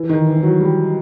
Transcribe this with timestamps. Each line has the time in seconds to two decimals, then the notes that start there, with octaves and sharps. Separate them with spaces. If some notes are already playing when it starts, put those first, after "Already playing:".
Already playing: E3
0.09 D#3
0.27 E3
0.37 E3
0.43 F#3
0.60 G3